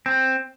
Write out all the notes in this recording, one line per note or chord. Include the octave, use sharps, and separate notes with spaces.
C4